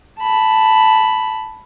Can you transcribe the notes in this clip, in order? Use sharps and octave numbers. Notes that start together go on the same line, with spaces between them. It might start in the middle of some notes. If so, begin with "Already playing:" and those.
A5 B5